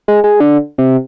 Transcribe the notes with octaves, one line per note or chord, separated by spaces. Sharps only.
G#3
G#3
D3
C3